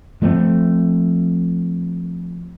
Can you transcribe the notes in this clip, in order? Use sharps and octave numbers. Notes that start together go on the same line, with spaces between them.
F3 A3 C4